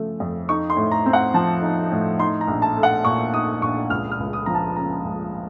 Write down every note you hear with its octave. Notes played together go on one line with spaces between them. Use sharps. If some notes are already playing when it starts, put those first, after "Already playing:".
Already playing: C#3 F3 A3
F2
D#4 C#6
C6
A2
A#5
C4
F#5
F3 A5
D#4
A2
D#4 C6
A#5
A#1
A5
A3
F#5
A#2 C#6
D#4 D#6
A#1 C#6
C#2 F6
F6
C#2
D#6
F3 A#5
A5
C#3 A#5
C#2